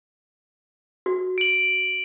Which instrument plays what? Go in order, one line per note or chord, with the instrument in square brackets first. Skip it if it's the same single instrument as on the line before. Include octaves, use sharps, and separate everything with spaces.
[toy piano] F#4
[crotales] D7 F#7